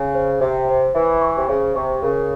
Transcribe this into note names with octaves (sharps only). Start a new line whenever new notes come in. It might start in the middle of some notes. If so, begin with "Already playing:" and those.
Already playing: C#3 G#5
C5
C3 E5
C5
E3 E5
C#6
C3
C#3 C5
C3 C#6
C#3 A#4